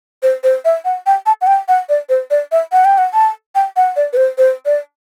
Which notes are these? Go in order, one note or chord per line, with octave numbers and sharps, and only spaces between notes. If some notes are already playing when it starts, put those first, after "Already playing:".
C5
C5
E5
F#5
G5
A5
F#5
G5
F#5
D5
C5
D5
E5
F#5
G5
F#5
A5
G5
F#5
D5
B4
C5
C5
D5